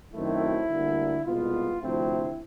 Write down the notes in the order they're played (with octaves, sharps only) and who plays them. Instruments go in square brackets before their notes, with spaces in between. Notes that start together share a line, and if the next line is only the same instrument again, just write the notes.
[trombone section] F#2 D#3 F#3 A3 C4 E4
D2 D3 G3 A#3
C2 B2 G#3 B3 F4
D2 C3 F3 A3 C4 E4